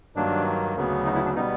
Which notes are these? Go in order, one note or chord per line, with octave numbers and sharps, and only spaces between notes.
G2 D#3 F#3 A#3 D4
D2 C#3 F#3 B3
D#4
E4
D4
B2 G3 B3 D#4